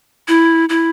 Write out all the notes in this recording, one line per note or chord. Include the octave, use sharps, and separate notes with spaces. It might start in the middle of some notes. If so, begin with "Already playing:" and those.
E4
E4